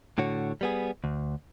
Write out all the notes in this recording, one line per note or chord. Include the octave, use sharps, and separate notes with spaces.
A2 D3 F#4 C#5
G3 B3 G#4
D2